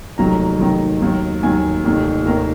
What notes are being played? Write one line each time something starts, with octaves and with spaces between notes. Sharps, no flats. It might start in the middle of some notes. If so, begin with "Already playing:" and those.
F1 D#2 D#3 F#3 A#5
F1 D#2 D#3 F#3
D#2 D#3 F#3
D#2 D#3 F#3 G#5
F1 D#2 D#3
D#2 D#3 A#4